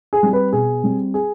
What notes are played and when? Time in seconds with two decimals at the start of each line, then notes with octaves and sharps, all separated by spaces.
0.13 G#4
0.23 G3 C4
0.33 B4
0.53 B2 G#4
0.84 G3 C4
1.14 G#4